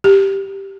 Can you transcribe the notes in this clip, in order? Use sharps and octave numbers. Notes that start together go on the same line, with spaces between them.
G4